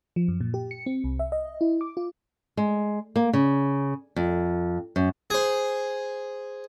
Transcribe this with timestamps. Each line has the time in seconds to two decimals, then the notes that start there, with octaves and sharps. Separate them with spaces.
0.16 F3
0.28 F#2
0.41 A#2
0.54 G4
0.71 C#7
0.86 C4
1.04 C2
1.19 E5
1.32 D#5
1.61 E4
1.81 D6
1.97 F4
2.57 G#3
3.16 A#3
3.33 C#3
4.16 F2
4.96 F#2
5.30 G#4 C5